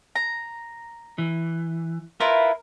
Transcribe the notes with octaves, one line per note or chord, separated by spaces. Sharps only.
A#5
E3
E4 F4 A#4 B4